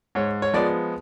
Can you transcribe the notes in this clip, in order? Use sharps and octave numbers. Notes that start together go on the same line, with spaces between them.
G#2 C#5
C#5
F3 G#3 B3 D5